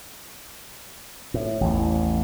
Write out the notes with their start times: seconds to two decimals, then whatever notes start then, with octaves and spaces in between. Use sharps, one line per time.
1.34 A2
1.61 A1 E2